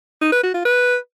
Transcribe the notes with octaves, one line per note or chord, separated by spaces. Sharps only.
D#4
B4
F#4
F4
B4